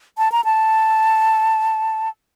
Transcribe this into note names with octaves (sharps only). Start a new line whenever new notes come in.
A5
A#5
A5